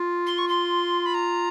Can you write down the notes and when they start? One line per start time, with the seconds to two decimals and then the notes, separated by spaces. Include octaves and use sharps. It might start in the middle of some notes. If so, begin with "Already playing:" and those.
Already playing: F4
0.26 C6
0.38 C#6
0.48 C6
1.06 B5
1.14 A#5